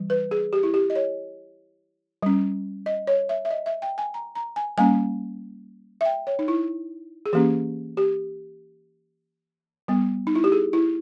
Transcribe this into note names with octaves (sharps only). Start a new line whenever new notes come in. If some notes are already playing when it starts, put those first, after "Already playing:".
Already playing: E3 G3
B4
G#4
G4
E4
G4
D#5
C#5
G3 C#4
D#5
C#5
E5
E5
D#5
E5
G5
G#5
A#5
A#5
G#5
G3 A#3 C#4 G#5
E5
G5
C#5
D#4
E4
G#4
E3 A#3 C#4 G4
G4
G3 B3
D#4
E4
G4
G#4
E4